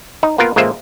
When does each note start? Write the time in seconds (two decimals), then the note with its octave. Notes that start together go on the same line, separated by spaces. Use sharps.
0.23 D#4
0.38 A#3 B3 F4 A#4
0.56 A1 G#3 A#3 F4 C5 E5